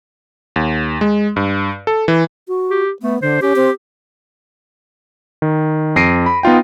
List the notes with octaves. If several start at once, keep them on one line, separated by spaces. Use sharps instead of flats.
D#2
G#3
G2
A4
E3
F#4
G4
A3 B3
D3 C5
C#4 G4
C4
D#3
F2 A#6 C7 D7 D#7
B5
B3 D#4 F4 G5